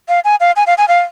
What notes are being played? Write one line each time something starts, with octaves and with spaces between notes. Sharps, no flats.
F5
G#5
F5
G#5
F5
G#5
F5